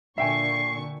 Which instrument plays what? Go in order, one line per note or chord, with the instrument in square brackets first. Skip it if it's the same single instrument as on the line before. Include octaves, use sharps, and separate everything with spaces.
[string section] A#2 D3 C#6 [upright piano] E5 G5 G#5 [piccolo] C7